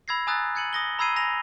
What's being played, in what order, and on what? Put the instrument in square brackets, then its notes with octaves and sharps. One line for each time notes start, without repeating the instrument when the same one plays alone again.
[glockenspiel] B5 E6 G#6 A#6 C7
G#5 A#5 D#6 E6 F#6 A6
F#6 G#6 C#7 D#7 F#7
D#6 A#6 G7
A#5 B5 E6 G#6 C7 D#7
G#5 B5 A#6 D#7 F7